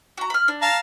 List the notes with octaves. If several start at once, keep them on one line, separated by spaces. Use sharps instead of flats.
F#4 A#5
B5 F6
D4
F5 A5 A#5